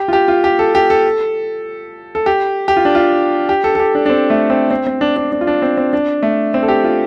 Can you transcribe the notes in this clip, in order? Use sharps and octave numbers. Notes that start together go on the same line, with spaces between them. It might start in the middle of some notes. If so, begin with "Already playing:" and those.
Already playing: G4
F4
G4
F4
G4
A4
G4
A4
A4
G4
G4
F4
D4
F4
G4
A4
A4
G4
D4
D4
C4
A3
C4
C4
C4
D4
D4
D4
F4
D4
C4
C4
D4
A3
C4
A4
G4
F4